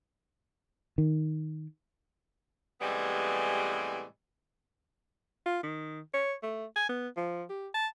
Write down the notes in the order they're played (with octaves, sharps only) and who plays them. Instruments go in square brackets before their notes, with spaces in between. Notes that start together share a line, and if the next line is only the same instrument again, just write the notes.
[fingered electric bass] D#3
[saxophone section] A2 C3 E3 G3 G#3 B3
[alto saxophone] F4
D#3
C#5
A3
G#5
B3
F3
G4
A5